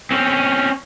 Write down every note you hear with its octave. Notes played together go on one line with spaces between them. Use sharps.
C4 C#4